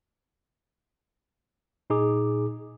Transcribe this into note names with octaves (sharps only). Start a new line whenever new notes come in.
A#2 D#4 G#4 D6